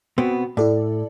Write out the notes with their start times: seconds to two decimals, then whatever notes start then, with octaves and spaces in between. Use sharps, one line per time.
0.18 B2 B3 C4
0.57 A2 E4 A4 D5